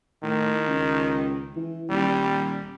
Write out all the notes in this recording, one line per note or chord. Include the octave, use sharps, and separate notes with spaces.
A2 D#3
C#2
E3
D#1 G3